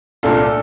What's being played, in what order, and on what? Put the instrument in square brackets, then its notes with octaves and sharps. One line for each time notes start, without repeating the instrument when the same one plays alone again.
[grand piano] C2 A#2 A3 D4 F4 [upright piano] A4